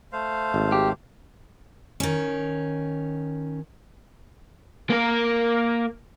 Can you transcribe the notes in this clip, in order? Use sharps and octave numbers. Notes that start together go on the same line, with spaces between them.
A3 C5 F5
G#1
G4
D#3 C#4
A#3 A#4